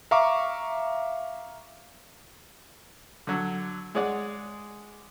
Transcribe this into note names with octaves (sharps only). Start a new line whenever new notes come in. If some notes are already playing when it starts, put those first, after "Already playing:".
E5 F5 A#5 C#6 D6
D3 F#3
G#3 G#4 C#5 D5 F#5